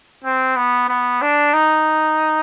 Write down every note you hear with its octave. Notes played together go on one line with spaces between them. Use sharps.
C4
B3
B3
D4
D#4